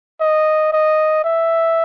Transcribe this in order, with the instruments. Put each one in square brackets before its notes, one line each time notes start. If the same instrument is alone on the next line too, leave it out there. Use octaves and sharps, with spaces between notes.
[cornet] D#5
D#5
E5